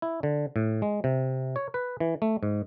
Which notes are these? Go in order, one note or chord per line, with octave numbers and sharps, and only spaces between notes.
E4
D3
A2
G#3
C3
C#5
B4
E3
A3
G#2